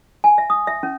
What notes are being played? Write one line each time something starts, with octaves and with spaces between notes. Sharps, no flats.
G#5
E5
D#6
E5
C#4